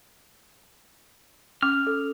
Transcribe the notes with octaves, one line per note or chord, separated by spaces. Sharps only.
C#4 D6 F6
A4